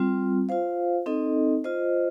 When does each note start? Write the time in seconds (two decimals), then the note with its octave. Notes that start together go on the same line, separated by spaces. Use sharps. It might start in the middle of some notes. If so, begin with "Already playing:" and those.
Already playing: G3 C4 F4
0.49 F4 C5 F5
1.06 C4 D#4 A4 D#5
1.64 F4 C5 D#5